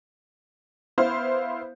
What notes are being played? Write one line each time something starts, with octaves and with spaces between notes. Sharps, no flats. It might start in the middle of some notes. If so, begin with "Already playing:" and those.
B3 E4 C5 F5